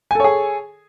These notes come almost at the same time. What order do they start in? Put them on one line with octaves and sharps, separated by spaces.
G#5 A4 C#5 G#4